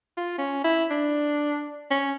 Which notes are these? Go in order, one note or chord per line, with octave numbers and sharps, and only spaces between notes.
F4
C#4
E4
D4
C#4